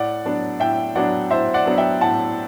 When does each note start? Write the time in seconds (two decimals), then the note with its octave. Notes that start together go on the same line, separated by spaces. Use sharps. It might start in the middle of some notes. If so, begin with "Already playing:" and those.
Already playing: A2 D5 F#5
0.25 F#3 B3 D4
0.60 A2 E5 G5
0.95 F#3 B3 D4 D5 F#5
1.31 A2 C5 E5
1.54 D5 F#5
1.65 F#3 B3 D4
1.78 E5 G5
2.01 A2 F#5 A5